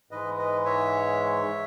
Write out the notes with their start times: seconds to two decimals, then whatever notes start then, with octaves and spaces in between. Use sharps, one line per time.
0.11 G#2 E3 G#3 B4 D#5
0.38 B4 D#5
0.66 C#5 E5